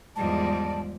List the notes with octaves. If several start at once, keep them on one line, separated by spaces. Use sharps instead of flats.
E2 G#2 F3 G3 D5 D#5 A5